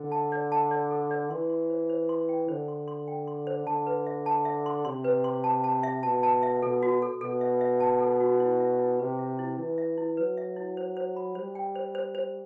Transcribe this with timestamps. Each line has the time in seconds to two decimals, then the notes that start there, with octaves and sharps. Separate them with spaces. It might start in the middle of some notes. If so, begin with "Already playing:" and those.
Already playing: D3
0.12 A5
0.32 D5
0.52 A5
0.71 D5
0.91 A4
1.11 D5
1.30 E3 C6
1.49 C6
1.70 C5
1.90 C5
2.09 C6
2.29 G5
2.48 D3 C5
2.68 C6
2.88 C6
3.08 G5
3.27 C6
3.47 C5
3.66 D3 A5
3.87 B4
4.07 E5
4.26 A5
4.45 E5
4.66 C6
4.85 C3 C6
5.04 B4
5.24 C6
5.44 A5
5.64 A5
5.83 E5
6.03 B2 A5
6.23 A5
6.43 E5
6.62 B2 A4
6.83 F#4
7.02 A4
7.21 B2 A4
7.41 E5
7.61 E5
7.80 A5
8.00 A4
8.20 F#4
8.40 E4
8.60 E5
8.79 E4
8.99 C3 B4
9.19 E5
9.39 E4
9.58 E3 E4
9.78 E5
9.97 E4
10.17 F#3 B4
10.37 E5
10.56 E4
10.77 C5
10.97 C5
11.16 B5
11.35 G3 C5
11.55 G5
11.75 C5
11.95 C5
12.15 C5